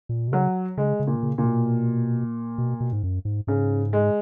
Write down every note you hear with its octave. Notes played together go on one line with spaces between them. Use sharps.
A#2
B2
C#3 F#3
C#3 G#3
C#3
A#2
C#3
A#2 C#3
B2
B2
B2
G#2
F#2
G#2
G#2 C#3
G#3